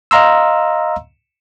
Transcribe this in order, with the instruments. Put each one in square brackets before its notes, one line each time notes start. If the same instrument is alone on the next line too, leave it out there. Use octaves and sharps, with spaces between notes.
[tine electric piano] D#5 F5 A#5 C6 E6